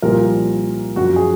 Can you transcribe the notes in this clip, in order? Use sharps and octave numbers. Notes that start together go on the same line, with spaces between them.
C2 A#2 F3 A#4
F#2 F3 F#4
G#4